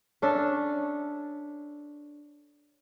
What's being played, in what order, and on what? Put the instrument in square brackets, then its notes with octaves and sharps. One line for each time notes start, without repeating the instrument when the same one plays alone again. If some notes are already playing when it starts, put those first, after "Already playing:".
[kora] C#4 D4 A4 E5